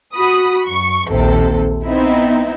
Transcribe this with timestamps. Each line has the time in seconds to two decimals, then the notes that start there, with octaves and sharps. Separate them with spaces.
0.14 F#4 B5 D#6
0.66 F#2 C#6
1.09 A#1 D#2 C3 A4
1.84 B3 C4 D#4 E4